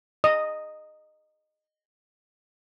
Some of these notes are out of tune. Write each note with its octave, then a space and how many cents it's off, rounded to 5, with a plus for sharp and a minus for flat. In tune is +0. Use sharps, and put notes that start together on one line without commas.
D#5 -15 D#6 +0